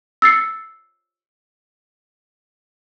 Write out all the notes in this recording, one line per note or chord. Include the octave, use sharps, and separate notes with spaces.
E6 A6 C7 C#7